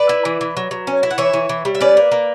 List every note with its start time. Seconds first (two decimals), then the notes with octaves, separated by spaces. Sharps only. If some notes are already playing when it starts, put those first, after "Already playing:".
Already playing: B4 D5
0.09 E4
0.25 E3
0.41 E3
0.57 F#3
0.71 F#3
0.87 C#4
1.03 E4
1.11 F#5
1.18 E3 C#5 E5
1.33 E3
1.49 E3
1.65 G3
1.75 E5
1.81 C#4 B4 D5
1.97 A#3
2.12 A#3